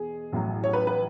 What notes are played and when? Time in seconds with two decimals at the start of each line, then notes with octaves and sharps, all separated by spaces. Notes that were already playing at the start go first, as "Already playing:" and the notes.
Already playing: E2 B2 G#4
0.33 A1 A2 F#3
0.64 C#5
0.73 B4
0.87 B4